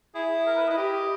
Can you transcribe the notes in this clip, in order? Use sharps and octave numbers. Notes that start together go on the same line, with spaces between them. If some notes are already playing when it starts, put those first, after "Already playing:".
E4 G#4
A#4
B4
E4 D#5
G4